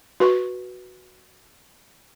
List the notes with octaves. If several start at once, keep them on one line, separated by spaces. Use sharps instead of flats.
F#4 B4 C#6